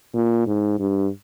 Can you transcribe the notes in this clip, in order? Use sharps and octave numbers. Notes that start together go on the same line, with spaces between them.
A#2
G#2
G2